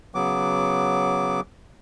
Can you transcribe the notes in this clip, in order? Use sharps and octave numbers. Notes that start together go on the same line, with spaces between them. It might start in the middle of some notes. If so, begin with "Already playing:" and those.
C#3 F#3 B3 D6